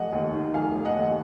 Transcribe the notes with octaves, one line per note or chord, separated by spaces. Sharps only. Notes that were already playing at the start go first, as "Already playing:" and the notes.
Already playing: F1 D#5 F#5
D#2
D#3
F1 F5 G#5
F1
D#5 F#5
D#2